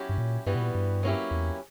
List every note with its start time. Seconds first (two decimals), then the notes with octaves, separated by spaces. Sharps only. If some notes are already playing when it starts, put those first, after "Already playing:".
Already playing: F#3 C#4 E4 G4
0.09 G2
0.18 A#2
0.46 G2 E3 G3 B3 F#4
0.55 B2
0.60 A#2
0.75 G2
1.03 F#3 A#3 C#4 E4 G4
1.31 E2